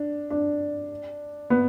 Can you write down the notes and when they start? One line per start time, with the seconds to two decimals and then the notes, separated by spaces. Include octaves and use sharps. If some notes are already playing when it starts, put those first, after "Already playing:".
Already playing: D4
0.30 D4
1.50 B3